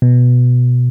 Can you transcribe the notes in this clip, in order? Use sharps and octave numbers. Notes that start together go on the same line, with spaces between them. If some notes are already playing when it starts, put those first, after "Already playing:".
B2